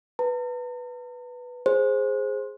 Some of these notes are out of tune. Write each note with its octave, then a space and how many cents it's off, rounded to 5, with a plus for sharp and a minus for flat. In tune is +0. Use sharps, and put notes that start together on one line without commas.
B4 +0 A#5 -45
G#4 +0 C5 +10